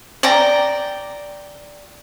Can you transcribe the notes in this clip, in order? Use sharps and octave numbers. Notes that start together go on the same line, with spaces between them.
D5 G5 A#5